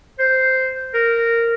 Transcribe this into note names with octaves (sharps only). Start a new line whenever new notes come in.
C5
A#4